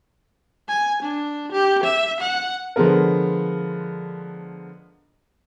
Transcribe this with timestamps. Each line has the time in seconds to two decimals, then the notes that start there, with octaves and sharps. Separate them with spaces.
0.68 G#5
1.02 D4
1.52 G4
1.84 E5
2.20 F#5
2.76 D3 F3 G#3 B3 A#4